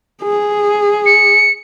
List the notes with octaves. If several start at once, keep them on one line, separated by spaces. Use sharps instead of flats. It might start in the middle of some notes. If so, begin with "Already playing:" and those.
G#4
C#7